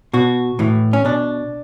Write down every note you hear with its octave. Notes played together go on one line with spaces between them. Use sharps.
B2 F#4
A2 E3
C#4
B2 D4